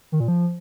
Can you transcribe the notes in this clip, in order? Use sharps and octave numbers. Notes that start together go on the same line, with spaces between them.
D#3
A#2
F3